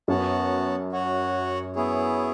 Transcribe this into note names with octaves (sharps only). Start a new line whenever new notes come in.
F#2 B3 F#4 C#5 F#5 A5
F#4 C#5 F#5
B3 E4 G#4 C#5